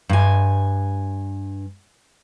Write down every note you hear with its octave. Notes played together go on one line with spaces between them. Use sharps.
G2 G#5